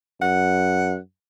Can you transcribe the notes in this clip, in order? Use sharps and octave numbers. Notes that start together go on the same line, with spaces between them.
F#2 F#5